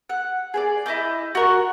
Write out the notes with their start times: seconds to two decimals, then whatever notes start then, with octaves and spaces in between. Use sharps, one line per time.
0.10 F#5
0.54 G#4 C5 D5
0.86 E4 D#5 D6 G6
1.35 F#4 A#4 C#6